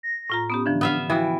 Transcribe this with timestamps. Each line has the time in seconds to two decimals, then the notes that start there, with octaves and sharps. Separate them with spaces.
0.03 A#6
0.30 A2 F4 A#5
0.50 B3 C#4 G4 D#6
0.66 D3 E3 F3 D4
0.81 B3 E5 F5
1.10 E3 F3 F#4 G5 B5